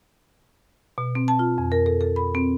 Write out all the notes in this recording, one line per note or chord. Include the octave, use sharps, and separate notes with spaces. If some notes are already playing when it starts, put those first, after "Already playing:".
B2
C4
A5
F4
F2
A#4
A4
A4
B5
C4